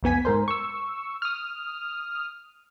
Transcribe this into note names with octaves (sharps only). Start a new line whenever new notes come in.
B1 F2 B3 G#5 B6
G#2 A#4 C5
C#6 E6
D#6 F6